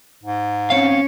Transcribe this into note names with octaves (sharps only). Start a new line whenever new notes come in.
G#2
C4 C#4 C#5 F5